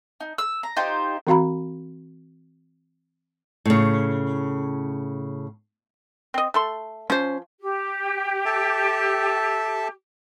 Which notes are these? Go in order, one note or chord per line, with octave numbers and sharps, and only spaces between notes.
D#4
E6
A#5
D#4 F4 G4 C5
E3 C4 F#4 F5 A#5 B5
A2 C#3
C4 D#5
A3 A4 C6
F3 C#4 C5
G4
A4 E5 A5